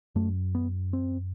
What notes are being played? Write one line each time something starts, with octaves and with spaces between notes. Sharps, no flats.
F#2 A3
B3
C4